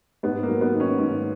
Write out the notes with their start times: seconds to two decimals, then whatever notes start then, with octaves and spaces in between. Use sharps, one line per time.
0.23 G#2 B3
0.43 A#3
0.48 F#3
0.61 B3
0.73 D#3
0.80 C#4
0.99 G#2